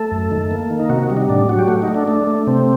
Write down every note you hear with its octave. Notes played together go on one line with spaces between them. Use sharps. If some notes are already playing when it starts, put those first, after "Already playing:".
Already playing: A3 A4
F#2
D#3
A#3
D#3
D#4
C3 F#4
F#4
G3
D#4
A2 D4
F#3 F#4
G4
A3 F#4
D#4
A3
D4
A3 D4
A3
C3 C4